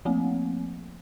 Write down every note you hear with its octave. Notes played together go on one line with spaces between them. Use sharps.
F3 A3 A#3 C4